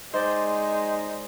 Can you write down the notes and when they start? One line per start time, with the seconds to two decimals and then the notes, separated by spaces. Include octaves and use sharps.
0.13 G#3 D#4 C5 D5